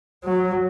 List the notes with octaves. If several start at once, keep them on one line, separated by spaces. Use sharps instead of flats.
F#3